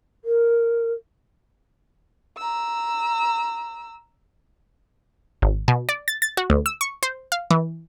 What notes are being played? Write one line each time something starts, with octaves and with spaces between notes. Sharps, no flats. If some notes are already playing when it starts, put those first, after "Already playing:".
A#4
A#5 E6
G#1
B2
D5
A6
A6
F#4
D2
E6
C#6
C5
F5
E3